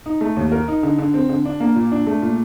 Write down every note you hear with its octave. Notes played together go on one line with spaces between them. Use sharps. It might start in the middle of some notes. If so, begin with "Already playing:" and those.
D#4
A3
D#2
A#4
D#4
D3
D3
C4
D3
D4
A#3
A#2
D4
A3
A#2